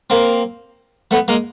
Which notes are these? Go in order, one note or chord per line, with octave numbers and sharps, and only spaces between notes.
A#3 C4
A3 B3
G#3 A#3